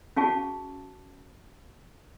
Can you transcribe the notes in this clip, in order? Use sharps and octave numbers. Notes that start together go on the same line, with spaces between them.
C#4 F#4 G#4 F5 A5 C#6